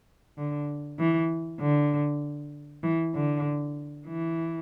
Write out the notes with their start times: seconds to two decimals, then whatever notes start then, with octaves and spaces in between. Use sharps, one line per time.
0.38 D3
0.99 E3
1.60 D3
2.83 E3
3.14 D3
4.07 E3